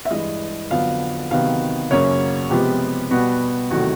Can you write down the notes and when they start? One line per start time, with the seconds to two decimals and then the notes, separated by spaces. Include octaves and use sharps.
0.05 E5
0.11 G2 E3 G#3 D#5
0.71 F2 D3 F#3 B3 F5
1.31 C3 D#3 F#3 B3 F5
1.91 F#2 C#3 F#3 A#3 C#4 C#5
2.50 C3 F3 G#3 B3 G4
3.10 B2 G3 B3 F#4
3.70 E2 C3 D#3 F#3 A3 F#4